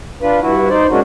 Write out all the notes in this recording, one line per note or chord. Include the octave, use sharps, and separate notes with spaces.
D4 F4 B4
G2 E3 E4 F#4
D#4 C5 D5
F#3 G#3 A#3 C#4 D4 F#4